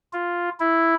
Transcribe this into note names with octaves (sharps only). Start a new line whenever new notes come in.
F4
E4